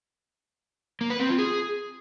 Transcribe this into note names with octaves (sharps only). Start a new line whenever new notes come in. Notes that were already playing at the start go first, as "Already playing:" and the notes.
A#3
B4
C4
F4
G#4